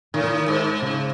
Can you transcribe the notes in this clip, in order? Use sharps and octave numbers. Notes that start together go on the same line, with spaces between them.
A2 D#3
E3
D#3
G#2
C#3